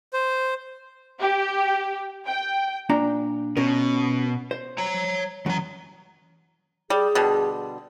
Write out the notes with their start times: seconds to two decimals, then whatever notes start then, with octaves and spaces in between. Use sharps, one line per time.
0.13 C5
1.20 G4
2.27 G5
2.89 A#2 D4 A#5
3.57 B2 C#4 A#4
4.51 C5
4.78 C#5 A#5
5.46 F#2 E3 A#5
6.90 G3 G#4
7.15 B2 D3 G3